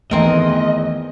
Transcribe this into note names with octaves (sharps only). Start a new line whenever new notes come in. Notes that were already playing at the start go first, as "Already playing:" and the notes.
E2 D#3 A3 C4 A#4 D#5